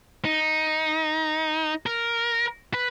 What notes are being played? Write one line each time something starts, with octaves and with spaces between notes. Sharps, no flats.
D#4
A#4
B4